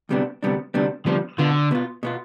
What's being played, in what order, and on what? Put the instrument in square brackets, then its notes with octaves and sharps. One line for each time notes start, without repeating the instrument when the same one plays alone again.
[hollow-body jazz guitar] D2 C3 G3 B3 D4
D2 C3 G3 B3 D4
D2 C3 G3 B3 D4
[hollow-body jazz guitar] D2 C3 G3 B3 D4 [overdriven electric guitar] F3
[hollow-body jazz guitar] B2 B3 F4 [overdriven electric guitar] D3
[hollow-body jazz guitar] B2 B3 F4
B2 B3 F4